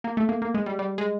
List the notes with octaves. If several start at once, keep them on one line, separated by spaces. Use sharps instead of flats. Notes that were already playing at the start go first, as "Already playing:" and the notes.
A#3
A3
A#3
A#3
G#3
G3
G3
G#3